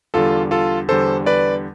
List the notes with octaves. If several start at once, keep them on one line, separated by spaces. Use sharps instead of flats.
E2 D3 G3 F4 A4
F4 A4
E2 D3 G3 A4 C5
B4 D5